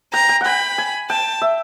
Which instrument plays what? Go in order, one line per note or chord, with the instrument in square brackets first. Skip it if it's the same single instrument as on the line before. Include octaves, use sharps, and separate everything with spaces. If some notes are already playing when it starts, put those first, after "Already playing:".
[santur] G5 [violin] A#5
[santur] G5
[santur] F#5 G5 [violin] B5
[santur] G#5
[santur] G5 [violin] A5
[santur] E5